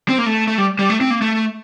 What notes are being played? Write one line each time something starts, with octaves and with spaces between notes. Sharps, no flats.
C4
A#3
A3
A3
G3
G3
A3
C4
A#3
A3